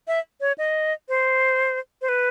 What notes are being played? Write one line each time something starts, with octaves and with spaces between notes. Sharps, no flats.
E5
C#5
D#5
C5
C5
B4